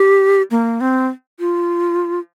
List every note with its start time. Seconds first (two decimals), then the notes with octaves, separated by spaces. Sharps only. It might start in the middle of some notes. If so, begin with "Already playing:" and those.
Already playing: G4
0.51 A#3
0.81 C4
1.40 F4